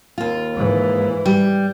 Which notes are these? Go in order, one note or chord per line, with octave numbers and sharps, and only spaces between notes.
D#2 F4
G#2 E3
G3